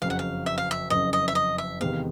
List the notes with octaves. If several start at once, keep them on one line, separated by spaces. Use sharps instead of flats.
F#1 F2 C#3 F#3 F5
F#5
F5
E5
F5
E5
F#1 F2 C#3 F#3 D#5
D#5
E5
D#5
E5
E2 C3 D#3 G#3 B3 F5